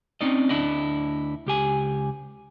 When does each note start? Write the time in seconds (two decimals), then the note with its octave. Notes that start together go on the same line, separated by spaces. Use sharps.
0.21 C4 C#4 D#4 D5 D#5
0.49 D2 D4 E4 D5 D#5
1.46 C#2 G4 G#5